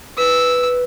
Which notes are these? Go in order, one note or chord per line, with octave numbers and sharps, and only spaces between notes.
B4 E6